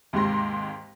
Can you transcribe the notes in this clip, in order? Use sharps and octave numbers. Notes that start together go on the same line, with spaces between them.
D#2 G#2 C3 G4 C6 A#6